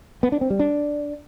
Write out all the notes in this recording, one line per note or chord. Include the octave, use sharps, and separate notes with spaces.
B3
D4
C4
G3
D4